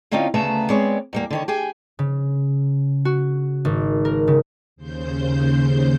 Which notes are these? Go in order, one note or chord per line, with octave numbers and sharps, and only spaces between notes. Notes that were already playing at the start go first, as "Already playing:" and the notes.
D3 A#3 C4 C#4 D#4 F4
D2 C#3 A3 B3 A5 A#5
G#3 B3 C4 C#5 D5
E2 G3 A#3
D3 D#3 C#5
G4 G#4 G#5
C#3
F#4
G#1
A#4
C#3
D#2 C#3 C5 G6